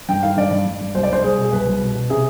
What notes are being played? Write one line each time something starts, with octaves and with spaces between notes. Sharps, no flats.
G2 G5
D#3 F5
G2 D5
G2
G2
G2
C2 C5
D5
C2 C5
C2 G#4
B2
G#4
C2 B4
C2
B2
B2
C3 G#4